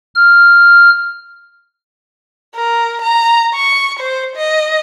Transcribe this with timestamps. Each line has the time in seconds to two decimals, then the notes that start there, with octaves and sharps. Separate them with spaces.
0.15 F6
2.55 A#4
3.02 A#5
3.55 C#6
3.99 C5
4.36 D#5